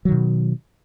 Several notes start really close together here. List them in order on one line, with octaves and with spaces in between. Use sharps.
F#3 D#3 B2